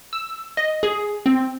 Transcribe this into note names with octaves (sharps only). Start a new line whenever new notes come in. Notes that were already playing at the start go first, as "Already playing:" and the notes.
E6
D#5
G#4
C4